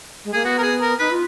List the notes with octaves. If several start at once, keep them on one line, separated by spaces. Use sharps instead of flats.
G#3
A#3 G#4
B3 F#4
A#4
G#4
A#4
D#4 B4
F4